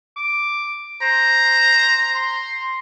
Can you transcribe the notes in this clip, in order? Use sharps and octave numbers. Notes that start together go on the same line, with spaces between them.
D6
C5 A#5
C6